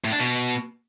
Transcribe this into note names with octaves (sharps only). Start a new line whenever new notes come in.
A2
D4
B2